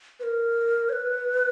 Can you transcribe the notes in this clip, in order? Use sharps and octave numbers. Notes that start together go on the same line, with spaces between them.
B4
A#4
C#5
B4